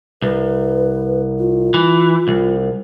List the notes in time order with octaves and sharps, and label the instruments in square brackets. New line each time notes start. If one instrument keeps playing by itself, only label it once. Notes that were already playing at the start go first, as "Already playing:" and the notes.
[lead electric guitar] C2 [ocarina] B4
[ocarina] F4
[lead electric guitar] E3
C2